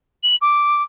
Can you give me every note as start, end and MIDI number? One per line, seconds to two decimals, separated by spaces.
0.23 0.36 102
0.42 0.82 86